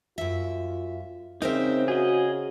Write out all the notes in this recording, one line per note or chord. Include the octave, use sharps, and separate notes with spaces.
F#2 F4 E5
C#3 C4 D#4 A#4 C5 E5
F#4 G#4 D#5